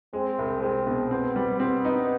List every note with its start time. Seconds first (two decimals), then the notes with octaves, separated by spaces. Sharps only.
0.13 G#3 C4
0.39 C2
0.62 G#3 C4
0.87 B2
1.11 B3 C4
1.36 G3
1.59 B3 C4
1.85 D#4